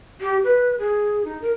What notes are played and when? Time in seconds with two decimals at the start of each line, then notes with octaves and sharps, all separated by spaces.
0.21 G4
0.44 B4
0.79 G#4
1.25 D#4
1.42 A#4